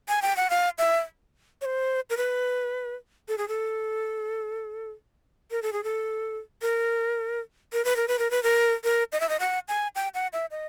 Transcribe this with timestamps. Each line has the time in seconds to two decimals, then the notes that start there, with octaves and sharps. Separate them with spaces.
0.08 G#5
0.22 G5
0.36 F#5
0.50 F5
0.78 E5
1.61 C#5
1.65 C5
2.10 A#4
2.17 B4
3.28 A4
3.38 G#4
3.48 A4
5.51 A#4
5.62 A4
5.73 G#4
5.84 A4
6.62 A#4
7.73 A#4
7.85 B4
7.96 A#4
8.08 B4
8.19 A#4
8.31 B4
8.43 A#4
8.84 A#4
9.12 D#5
9.20 E5
9.29 D#5
9.40 F#5
9.68 G#5
9.95 G5
10.14 F#5
10.33 E5
10.51 D#5